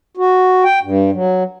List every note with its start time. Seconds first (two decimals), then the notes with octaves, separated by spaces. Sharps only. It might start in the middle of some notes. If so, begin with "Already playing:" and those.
0.17 F#4
0.65 G5
0.83 G2
1.13 F#3